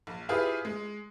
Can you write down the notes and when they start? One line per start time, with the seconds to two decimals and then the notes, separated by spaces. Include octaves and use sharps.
0.07 A#1
0.29 E4 F4 G4 G#4 B4
0.65 G#3